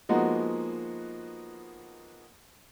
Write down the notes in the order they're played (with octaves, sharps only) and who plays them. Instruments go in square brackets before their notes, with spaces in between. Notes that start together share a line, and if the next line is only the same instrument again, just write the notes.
[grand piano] F3 G#3 A#3 B3 D#4 F#4